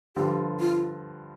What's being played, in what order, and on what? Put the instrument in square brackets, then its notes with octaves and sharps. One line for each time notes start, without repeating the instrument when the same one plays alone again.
[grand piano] G2 D3 F3 [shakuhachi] G4
[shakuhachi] F4